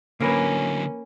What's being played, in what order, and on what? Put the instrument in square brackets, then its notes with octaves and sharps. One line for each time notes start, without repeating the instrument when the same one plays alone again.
[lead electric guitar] D3 F#3 [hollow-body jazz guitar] A#3 A#4 B4 [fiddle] C#4